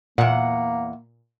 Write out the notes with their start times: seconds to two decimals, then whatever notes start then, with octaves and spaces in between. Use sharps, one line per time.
0.18 E2 A#2 A#3 F#5